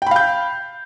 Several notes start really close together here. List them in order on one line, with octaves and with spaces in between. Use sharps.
G5 B5 F5 G6